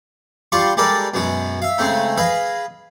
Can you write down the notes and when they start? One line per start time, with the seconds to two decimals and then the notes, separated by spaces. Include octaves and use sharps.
0.52 G3 D4 F4 C6 C#6
0.77 G3 G#3 D4 A4 A#4 D5
1.14 F#2 B2 G#3 F#4
1.62 E5 F5
1.78 C#3 G#3 A3 C4 D#4
2.18 G#4 B4 D#5 F5